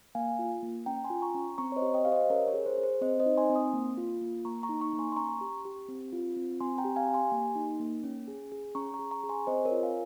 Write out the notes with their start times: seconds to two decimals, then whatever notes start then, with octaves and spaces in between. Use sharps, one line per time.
0.15 A#3 F5 G#5
0.39 F4
0.63 A#3
0.86 C#4 G5 A#5
1.04 G#5 C6
1.10 F4
1.22 A#5 C#6
1.35 C#4
1.58 C4 A#5 C#6
1.72 C#5
1.76 C5 D#5
1.82 G4
1.94 D#5 G5
2.05 G4 F5
2.12 C5 D#5
2.30 C#4 A#4 C#5
2.48 A#4 C#5
2.54 G#4
2.66 C5
2.78 G#4
2.83 C5
3.01 C4 C5 D#5
3.20 C5 D#5
3.26 D#4
3.37 G#5 C6
3.50 C4
3.56 C6 D#6
3.73 A#3
3.97 F4
4.21 A#3
4.45 A#3 A#5 C#6
4.63 A#5 C#6
4.69 D#4
4.81 A#5 C#6
4.93 A#3
4.99 G#5 C6
5.12 C6
5.17 C#4 A#5 C#6
5.41 G4
5.65 G4
5.88 C4
6.13 F4
6.37 C4
6.60 C4 G#5 C6
6.78 G5 A#5
6.84 G4
6.96 F5 G#5
7.08 G4
7.14 G#5 C6
7.32 A#3
7.55 D#4
7.80 A#3
8.03 C#4
8.28 G#4
8.52 G#4
8.75 C#4 A#5 C#6
8.94 A#5 C#6
8.99 G#4
9.11 A#5 C#6
9.24 G#4
9.29 G#5 C6
9.47 C4 C5 D#5
9.65 A#4 C#5
9.72 F4
9.83 F5 G#5